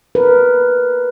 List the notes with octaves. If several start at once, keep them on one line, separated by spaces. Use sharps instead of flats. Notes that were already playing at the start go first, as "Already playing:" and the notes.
A#4 B4